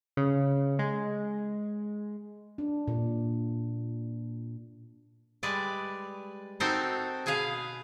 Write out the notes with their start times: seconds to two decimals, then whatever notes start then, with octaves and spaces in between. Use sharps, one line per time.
0.17 C#3
0.79 G#3
2.58 D4
2.88 A#2
5.43 G3 G#3 B4 D5
6.60 C4 D#4 F#4 A4 A#4 C5
7.26 B2 G#4 B4 F5 G#5